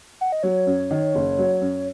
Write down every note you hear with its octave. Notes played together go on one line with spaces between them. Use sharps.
F#5
D#5
F#3 C#5
F#2
D#3
F#1
F#3
F#2